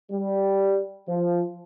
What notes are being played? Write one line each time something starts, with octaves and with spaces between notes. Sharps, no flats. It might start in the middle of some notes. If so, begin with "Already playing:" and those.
G3
F3